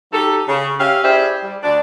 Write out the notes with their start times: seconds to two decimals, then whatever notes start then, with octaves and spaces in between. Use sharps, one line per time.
0.13 F#3 D#4 G4 A4
0.48 C#3
0.80 C#4 G4 E5 F5
1.04 E4 G4 G#4 C5 D5 E5
1.44 G3
1.63 D2 D4 D5